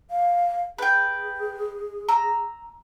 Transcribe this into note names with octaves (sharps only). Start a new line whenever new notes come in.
F5
G#4 B4 G5
A#5 E6